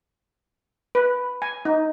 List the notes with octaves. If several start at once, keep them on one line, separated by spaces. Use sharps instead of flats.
B4
G#5
D#4